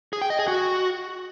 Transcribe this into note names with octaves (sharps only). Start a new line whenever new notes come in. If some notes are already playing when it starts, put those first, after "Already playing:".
G#4
G5
D#5
G#4
F#4